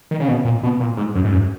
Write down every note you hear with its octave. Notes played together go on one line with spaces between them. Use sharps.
D#3
C#3
B2
A#2
B2
A#2
G#2
F#2
G#2
F#2